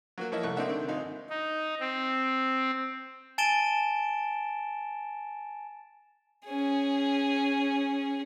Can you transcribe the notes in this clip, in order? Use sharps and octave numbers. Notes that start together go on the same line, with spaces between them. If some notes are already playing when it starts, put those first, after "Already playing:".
F#3 A#3 F#4
F3 A#3 E4 C#5 D#5 E5
C2 A3 C#6 F#6
A#3 C4 D4 D#4 E5 F#5
D3 D#3 C4
G#1 D#4 F5
D#4
C4
G#5 A5 A6 D7 E7 G7
C#4 G#4